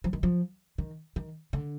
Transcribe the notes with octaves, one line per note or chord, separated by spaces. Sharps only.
F3
D#3
F3
D#3
D#3
D3